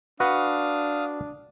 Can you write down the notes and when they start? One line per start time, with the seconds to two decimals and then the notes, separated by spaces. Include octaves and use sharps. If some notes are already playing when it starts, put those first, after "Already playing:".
0.20 D4 F#4 B4 F5 F#5 D#6